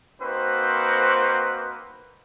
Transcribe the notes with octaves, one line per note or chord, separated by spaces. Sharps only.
A#3 C4 D#4 F#4 B4 C5